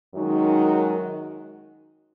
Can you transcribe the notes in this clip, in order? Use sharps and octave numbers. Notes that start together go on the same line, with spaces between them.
F#2 D#3 G#3 D#4 F#4